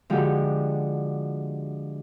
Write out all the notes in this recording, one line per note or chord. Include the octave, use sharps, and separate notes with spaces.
D3 F3 G#3 D#4 F#4 G4